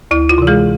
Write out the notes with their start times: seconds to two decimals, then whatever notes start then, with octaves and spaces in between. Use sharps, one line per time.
0.11 D2 E4
0.29 F4
0.38 C3 E3
0.47 G#3 G#4